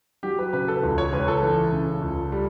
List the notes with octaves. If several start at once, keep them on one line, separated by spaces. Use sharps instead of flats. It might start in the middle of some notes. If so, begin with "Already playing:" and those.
F#3 G4
B4
C#3 B4
A4
C#2
C#5
C#2 B4
A4
E3
C#3
C#2
G3